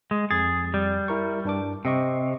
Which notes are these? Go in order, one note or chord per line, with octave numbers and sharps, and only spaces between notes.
G#3
F2 G#4 A6
G3
E4 A#4 C#6
G2 D4 D6
C3 C4 D#5 C#6